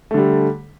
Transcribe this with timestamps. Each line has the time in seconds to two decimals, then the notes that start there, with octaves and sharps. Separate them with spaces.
0.11 A3
0.14 D3
0.18 G3